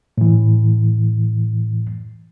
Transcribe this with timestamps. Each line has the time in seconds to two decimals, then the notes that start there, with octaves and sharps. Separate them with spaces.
0.18 A2 E3